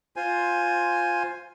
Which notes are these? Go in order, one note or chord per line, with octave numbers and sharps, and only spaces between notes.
F4 C5 G#5